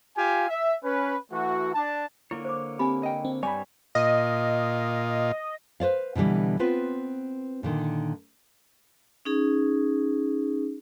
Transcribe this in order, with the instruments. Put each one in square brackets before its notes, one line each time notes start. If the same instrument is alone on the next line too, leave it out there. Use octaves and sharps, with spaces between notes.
[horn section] F4 G4 F5 G#5
E5
C#4 B4
E3 A3 F#4
D4 A5
[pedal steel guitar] D3 A#3 C#5 [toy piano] E4
[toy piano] C5 D6
[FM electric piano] C4 G4 [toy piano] G#5 B5
[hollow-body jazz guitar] D#5 G5
[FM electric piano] C4
[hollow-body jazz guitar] G2 G#5 [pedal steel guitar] G3 C4 C#5 [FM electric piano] D5 B5
[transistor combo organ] A#2 F4 [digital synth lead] D#5
[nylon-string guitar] B4 C5 D5 F5
B2 D3 E3 G3
B3 C4 F4 B4
A#2 D3 D#3
[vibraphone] C#4 D#4 G#4